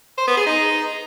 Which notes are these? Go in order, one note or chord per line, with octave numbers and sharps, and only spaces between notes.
C5
B3
G#4
D#4